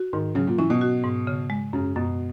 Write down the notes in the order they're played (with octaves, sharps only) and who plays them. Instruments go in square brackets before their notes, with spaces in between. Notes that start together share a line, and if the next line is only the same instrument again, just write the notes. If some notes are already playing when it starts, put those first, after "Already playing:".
Already playing: [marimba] F#4
[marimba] G#2 [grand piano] D#3
[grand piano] C#3 [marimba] F#3
[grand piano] A#2
[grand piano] E3 [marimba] C#4
[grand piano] B2
[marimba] F#4
G#2
C#3
G#3
[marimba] F#2 [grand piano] C#3
[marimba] F#2 [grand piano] B2